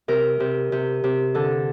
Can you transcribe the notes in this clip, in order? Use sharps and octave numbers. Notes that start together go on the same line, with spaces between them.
C3 A#4
C3
C3
C3
D3 A4